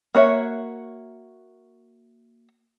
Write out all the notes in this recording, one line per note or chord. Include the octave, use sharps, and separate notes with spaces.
A#3 F#4 C#5 E5